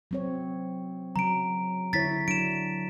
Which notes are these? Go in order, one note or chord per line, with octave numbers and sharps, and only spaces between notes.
F#3 C4 C#5
C#3 F#3 A#5 D7
D3 E4 C#5 A6 B6
F#3 D4 D7 E7